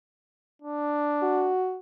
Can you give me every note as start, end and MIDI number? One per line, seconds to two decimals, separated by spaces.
0.62 1.53 62
1.23 1.79 66